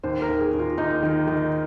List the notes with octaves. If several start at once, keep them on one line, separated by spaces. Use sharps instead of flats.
D#2 C5
A#4
D#2
G#4
D#2
F4
D#2 D#4
D#3
D#3